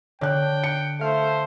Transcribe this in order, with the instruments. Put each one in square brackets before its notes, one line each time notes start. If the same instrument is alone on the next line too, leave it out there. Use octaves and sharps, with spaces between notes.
[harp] D3 [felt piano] C#5 F#6 [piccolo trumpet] G5
[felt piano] C#7
[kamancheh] A3 [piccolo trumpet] C5 [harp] F5